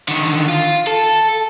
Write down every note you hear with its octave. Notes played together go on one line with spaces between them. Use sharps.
D3 D#3
F4
A4